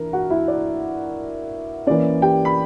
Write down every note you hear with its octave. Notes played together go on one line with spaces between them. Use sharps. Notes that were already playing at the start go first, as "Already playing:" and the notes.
Already playing: E3 D4 E4 A#4 A#5
F#4 F#5
E4 E5
D5
E3 A#3 C#4 D5
G4 G5
B5